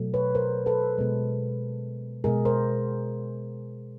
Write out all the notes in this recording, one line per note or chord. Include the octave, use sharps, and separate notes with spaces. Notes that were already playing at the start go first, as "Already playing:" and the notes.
Already playing: B2 F#3 A3
B4 C#5
A#4 C5
A4 B4
B2 G#3
B2 G#3 G#4 A#4
A#4 C5